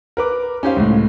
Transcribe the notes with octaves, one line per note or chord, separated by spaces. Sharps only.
A#4 B4 D6
C#4 D#4 G4 C5 F5
C#2 A2